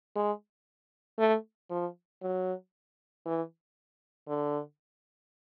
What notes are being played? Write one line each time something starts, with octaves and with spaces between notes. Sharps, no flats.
G#3
A3
F3
F#3
E3
D3